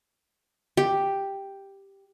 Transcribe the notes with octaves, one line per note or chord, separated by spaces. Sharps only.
G4